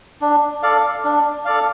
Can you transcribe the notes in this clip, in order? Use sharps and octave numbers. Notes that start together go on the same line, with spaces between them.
D4
A4 D5 F5
D4
A4 D5 F5